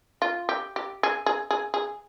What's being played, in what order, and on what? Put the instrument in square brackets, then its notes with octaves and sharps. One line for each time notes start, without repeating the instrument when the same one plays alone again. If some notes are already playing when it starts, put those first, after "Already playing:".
[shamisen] F4
G4
G4
G#4
G#4
G#4
G#4